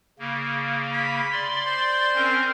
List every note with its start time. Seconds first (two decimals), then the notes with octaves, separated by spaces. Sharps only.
0.19 C#3 A#3
0.93 B5
1.32 D5 C6
1.66 C5
2.15 C4 C#4 A#4